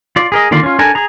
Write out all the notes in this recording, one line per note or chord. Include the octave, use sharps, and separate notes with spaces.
F4 D5
G#4 A#4 D#5
D3 D#3 A#3 F4 D5
C#4 F4
D4 A4 A#4 G#5
G#4 A#5